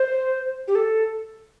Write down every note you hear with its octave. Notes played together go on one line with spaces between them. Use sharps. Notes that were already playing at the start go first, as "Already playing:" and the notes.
Already playing: C5
G4
A4